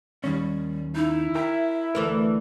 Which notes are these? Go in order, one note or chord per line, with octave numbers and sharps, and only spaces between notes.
D#2 D#3 G3 C#4
D#4 E4
A#4 E5 G5 A#5
D2 E3 A4 A#4